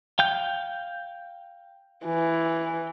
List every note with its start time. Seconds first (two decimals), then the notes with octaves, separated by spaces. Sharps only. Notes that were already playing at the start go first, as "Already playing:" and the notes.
0.19 F5 G5 G6
2.06 E3